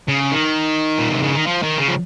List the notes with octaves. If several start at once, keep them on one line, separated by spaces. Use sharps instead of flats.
C#3
D#3
A#2
C3
C#3
D#3
F3
D#3
C#3
F3